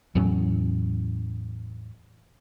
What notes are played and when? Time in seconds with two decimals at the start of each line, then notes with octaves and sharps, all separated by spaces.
0.15 E2 A2 F#3 C#4